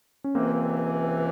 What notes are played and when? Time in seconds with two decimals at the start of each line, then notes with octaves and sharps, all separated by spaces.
0.24 C#4
0.35 C#2 C3 E3 A#3 C4